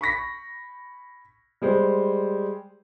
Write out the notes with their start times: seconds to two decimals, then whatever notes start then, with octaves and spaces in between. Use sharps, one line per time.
0.01 B5 C#6 A#6 B6
1.62 G3 G#3 C5